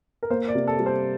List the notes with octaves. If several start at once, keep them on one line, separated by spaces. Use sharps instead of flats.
A#4
A#3 C5
D5
C3
A4
G3
C5